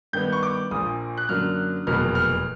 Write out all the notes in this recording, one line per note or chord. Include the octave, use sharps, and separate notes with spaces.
G2 D#3 G3 B3 G6
C#6
D6
A#1 A#2 F3 D#6
F#6
F#2 D3 F#3 A#3 F6
F1 E2 B2 F#3 A#3 F6
F6